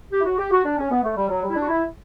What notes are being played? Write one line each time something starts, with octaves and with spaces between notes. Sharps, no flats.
G4
E4
F#4
G4
F#4
D4
C#4
B3
A3
G3
F#3
G3
E4
D4
F#4
E4